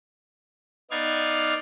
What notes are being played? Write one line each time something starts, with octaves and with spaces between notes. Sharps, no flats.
B3 D#4 D5 F5 F6 G#6